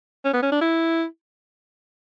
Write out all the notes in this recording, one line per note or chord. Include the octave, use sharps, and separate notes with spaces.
C#4
B3
C#4
D4
E4